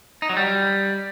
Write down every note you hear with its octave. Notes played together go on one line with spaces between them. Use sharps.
D#4
F#3
G3